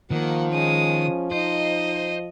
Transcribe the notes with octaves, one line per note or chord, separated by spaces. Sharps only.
D#3 F3 A#3 F#5
G#3 C#4 D#6
D#4 C5 D#5